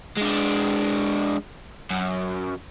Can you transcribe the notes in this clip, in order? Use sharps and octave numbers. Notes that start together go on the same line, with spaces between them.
G#3 D4
F#2